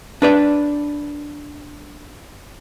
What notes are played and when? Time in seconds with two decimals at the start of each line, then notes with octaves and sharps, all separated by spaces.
0.22 D4 B4 D5